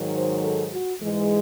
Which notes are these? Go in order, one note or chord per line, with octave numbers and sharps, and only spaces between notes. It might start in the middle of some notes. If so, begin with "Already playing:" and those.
Already playing: G#2 D#3 F#3
C5
A4
F#4
G#2 E3 G#3